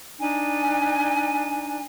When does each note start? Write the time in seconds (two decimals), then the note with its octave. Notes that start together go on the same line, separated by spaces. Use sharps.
0.20 D4 D#4 G#5